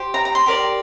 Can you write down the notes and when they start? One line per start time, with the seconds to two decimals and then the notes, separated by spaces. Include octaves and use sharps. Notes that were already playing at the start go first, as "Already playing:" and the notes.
Already playing: G4 C5
0.14 A#5
0.25 A#5
0.35 C6
0.46 G4 A#4 D5